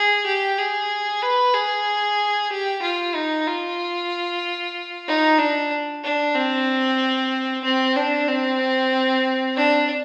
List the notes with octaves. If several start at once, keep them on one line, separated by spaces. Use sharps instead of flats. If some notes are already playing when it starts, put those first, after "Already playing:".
Already playing: G#4
G4
G#4
B4
G#4
G4
F4
D#4
F4
D#4
D4
D4
C4
C4
D4
C4
D4